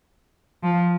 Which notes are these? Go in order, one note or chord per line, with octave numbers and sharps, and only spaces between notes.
F3